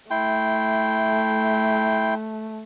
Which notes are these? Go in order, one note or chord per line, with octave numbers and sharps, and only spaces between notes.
A3 E4 G5 C6